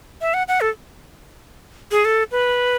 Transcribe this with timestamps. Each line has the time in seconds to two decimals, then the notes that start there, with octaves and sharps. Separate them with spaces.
0.21 E5
0.34 F#5
0.48 F#5
0.61 A4
1.91 G#4
2.05 A4
2.32 B4